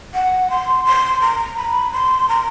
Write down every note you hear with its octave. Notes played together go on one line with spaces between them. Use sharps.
F#5
C6
C6
A#5
B5
C6
A#5